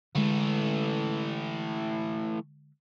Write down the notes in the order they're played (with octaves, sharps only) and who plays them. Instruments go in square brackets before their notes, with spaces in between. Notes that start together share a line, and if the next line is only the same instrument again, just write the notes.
[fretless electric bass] D3 G#3 [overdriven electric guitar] E3 A3